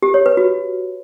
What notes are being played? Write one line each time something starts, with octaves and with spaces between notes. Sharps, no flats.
G4
C#5
B4
F#4